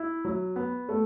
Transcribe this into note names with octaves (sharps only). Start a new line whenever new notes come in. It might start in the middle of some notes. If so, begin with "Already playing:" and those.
Already playing: E4
F#3
B3
A3